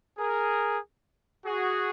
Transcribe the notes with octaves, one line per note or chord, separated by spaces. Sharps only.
G#4 A#4
F#4 G#4